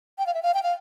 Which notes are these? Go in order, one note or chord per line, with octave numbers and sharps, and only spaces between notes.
G5
F5
E5
F5
G5
F5